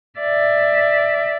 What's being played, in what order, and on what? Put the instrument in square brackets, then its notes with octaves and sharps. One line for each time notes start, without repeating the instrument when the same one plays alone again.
[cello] D5 E5